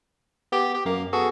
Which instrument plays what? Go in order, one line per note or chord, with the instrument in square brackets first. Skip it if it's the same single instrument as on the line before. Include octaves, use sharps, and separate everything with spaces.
[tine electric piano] B3 [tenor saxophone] G4
[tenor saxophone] G4
[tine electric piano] F#2 [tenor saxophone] A#3
[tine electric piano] B3 G#4 A4 [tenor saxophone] F#4